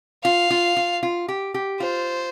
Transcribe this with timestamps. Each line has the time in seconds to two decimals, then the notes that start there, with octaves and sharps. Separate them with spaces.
0.24 F4 F5
0.50 F4
0.77 F4
1.03 F4
1.28 G4
1.54 G4
1.80 F4 C5